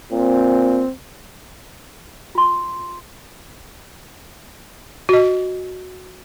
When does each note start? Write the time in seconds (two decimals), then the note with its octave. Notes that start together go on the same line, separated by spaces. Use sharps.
0.12 A#2 C4
2.35 F4 C6
5.09 F#4 D#5